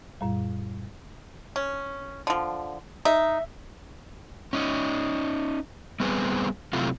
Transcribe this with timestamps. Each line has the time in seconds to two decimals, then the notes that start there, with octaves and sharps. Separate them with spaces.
0.21 F#2 A#2 G3
1.56 C#4
2.27 D3 F3
3.05 D#4 E5
4.53 C#4 D#4
6.00 G3 B3 C4 G#4 B4 C5
6.73 C3 F#3 A3 C4 E4 F4